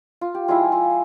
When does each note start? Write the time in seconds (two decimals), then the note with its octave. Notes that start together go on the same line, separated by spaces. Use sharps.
0.21 F4
0.35 G4
0.48 F3 G#3 E4 F4 G#4
0.72 F4